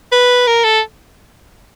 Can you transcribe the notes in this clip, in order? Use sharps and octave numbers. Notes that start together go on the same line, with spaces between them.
B4
A#4
A4